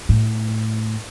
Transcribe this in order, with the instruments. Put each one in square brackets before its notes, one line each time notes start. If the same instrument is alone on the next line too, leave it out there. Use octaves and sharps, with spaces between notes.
[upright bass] A2